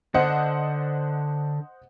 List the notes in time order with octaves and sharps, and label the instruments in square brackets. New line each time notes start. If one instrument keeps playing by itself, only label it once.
[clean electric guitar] D3 [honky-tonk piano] C5 D#5 F#5